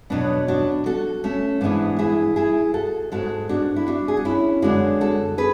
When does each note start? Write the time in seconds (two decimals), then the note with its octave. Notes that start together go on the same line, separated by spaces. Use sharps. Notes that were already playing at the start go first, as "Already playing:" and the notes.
0.10 E2 B2 F#3 B3 D4
0.48 D4 F#4
0.86 F#4 A4
1.24 A3 C#4
1.61 G#2 E3 G#3 B3 D4
1.99 E4 G#4
2.36 E4 G#4
2.74 F#4 A4
3.12 G#2 G#3 F#4 A4
3.49 D4 F#4
3.76 E4
3.87 D4 F#4
4.08 G#4
4.17 F#4
4.25 C#4 E4
4.62 F#2 D3 G#3 D4 F#4
5.01 F#4 A4
5.38 G#4 B4